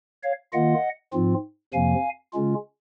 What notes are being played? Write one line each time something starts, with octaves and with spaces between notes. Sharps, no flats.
C#5 F5
D#3 A#3 F4 D#5 F#5
G#2 F3 C4 F4
F2 C3 F3 A#3 F5 G#5
C#3 G#3 C#4 F4